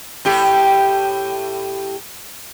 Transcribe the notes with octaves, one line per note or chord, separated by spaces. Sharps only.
A2 G4